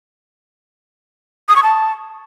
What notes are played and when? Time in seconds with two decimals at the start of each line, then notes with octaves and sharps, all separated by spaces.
1.49 D#6
1.56 C#6
1.63 A5